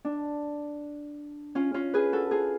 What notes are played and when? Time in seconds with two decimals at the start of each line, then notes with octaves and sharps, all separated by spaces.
0.05 D4
1.55 C#4 F4
1.74 C#4 F4
1.94 G#4 B4
2.13 F#4 A4
2.31 F4 G#4